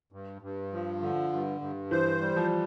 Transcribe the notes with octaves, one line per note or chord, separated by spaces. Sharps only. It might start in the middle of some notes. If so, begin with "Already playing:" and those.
G2
G2
F3
D3
G2
G2
E3 C5
G3
F3